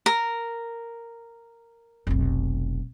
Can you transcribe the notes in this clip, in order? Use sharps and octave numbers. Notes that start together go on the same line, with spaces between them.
A#4
F1 B1